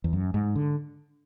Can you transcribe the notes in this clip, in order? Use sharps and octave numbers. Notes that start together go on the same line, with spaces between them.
E2
F#2
G#2
D3